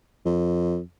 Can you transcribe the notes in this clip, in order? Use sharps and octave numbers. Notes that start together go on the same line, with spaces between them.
F2